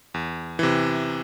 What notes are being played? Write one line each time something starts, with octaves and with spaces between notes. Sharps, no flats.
E2
C3 E3